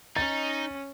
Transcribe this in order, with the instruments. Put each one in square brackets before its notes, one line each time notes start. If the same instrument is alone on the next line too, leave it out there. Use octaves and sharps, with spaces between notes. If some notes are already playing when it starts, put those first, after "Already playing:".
[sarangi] C#4 [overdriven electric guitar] D#4 [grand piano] A6